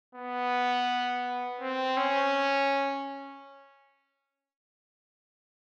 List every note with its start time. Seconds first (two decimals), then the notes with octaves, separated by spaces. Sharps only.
0.15 B3
1.61 C4
1.97 C#4